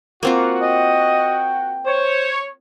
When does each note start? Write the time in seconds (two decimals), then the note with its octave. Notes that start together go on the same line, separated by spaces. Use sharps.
0.23 A#3 C4 F4 F#4
0.62 D#5 G5
1.86 C5 C#5